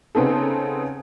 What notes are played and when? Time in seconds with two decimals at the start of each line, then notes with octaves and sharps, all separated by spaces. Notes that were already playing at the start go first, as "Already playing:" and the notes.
0.15 C#3 B3 C4 D#4 A4